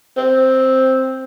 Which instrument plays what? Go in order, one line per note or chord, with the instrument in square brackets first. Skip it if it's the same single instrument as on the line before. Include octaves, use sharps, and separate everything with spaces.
[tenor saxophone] C4